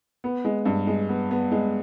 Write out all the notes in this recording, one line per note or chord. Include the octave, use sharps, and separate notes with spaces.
B3
G#3
G2
G#3
B3
B3
G#3